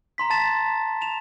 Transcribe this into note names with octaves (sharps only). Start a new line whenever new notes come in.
A#5 C6 B6
A5 A6 E7
E7 F7